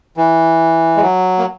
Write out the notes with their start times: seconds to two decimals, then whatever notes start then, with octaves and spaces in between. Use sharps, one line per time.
0.17 E3
0.96 G#3
1.02 F#3
1.38 A#3